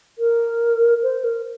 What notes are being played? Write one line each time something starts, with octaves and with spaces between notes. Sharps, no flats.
A#4
C5
A#4